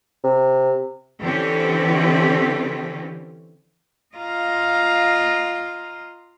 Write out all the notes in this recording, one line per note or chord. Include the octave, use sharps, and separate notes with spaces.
C3
D3 E3 C4 C#4 G4
F4 D#5 F5 A#5 C6